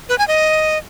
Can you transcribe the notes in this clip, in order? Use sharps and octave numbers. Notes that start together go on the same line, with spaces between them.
B4
G#5
D#5